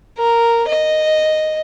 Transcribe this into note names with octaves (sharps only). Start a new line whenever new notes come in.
A#4
D#5